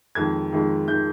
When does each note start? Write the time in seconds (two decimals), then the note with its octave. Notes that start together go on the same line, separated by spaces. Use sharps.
0.15 F2 D#3 G#3 G#6
0.52 F2 D#3 G#3
0.88 D#3 G#3 G6